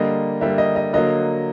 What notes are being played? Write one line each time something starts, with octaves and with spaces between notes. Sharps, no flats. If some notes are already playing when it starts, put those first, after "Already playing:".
Already playing: D3 G3 A#3 D#5
D3 G3 A#3 E5
D#5
D#5
D3 F#3 A#3 D#5